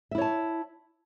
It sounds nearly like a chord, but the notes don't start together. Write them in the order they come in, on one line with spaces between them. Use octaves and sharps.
E5 E4 C#5 A5